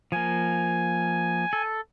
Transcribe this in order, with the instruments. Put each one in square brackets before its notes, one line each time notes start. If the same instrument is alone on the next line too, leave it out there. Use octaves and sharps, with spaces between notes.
[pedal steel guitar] F3 A#3 [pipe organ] G#5
[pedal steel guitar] A4